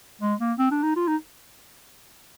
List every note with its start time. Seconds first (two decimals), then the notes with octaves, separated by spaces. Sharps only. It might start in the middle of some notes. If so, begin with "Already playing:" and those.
0.21 G#3
0.40 A#3
0.58 C4
0.71 D4
0.83 D#4
0.96 F4
1.07 D#4